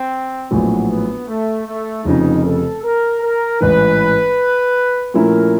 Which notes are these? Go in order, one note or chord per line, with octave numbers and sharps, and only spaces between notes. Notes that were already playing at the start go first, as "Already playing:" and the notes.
Already playing: C4
A#1 A2 F#3 B3
B3
A3
A3
F1 F2 C#3 D#4
A4
A#4
A#4
A1 G#2 E3 B4
A#2 F3 A3 C#4 E4 A#4